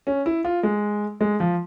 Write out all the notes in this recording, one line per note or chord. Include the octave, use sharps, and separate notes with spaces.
C#4
E4
F4
G#3
G#3
F3